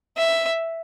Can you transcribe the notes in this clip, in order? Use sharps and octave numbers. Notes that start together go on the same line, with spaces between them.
E5